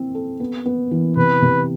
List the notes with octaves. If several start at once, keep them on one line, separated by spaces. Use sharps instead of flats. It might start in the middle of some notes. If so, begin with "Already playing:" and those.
Already playing: C4 E4
A4
B3
B3
E3
C3 B4
C3